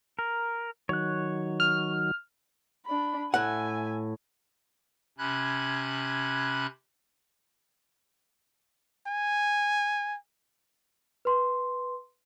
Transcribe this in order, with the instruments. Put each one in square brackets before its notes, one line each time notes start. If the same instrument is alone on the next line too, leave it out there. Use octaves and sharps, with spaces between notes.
[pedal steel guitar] A#4
[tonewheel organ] D#3 F#3 [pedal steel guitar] C#5 F#6
[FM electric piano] F6
[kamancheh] D4 B5
[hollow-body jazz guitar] A2 F#5 [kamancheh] E5 G#5
[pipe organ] C3 C#4 B5 F#6 G#6
[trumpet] G#5
[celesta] B4 C6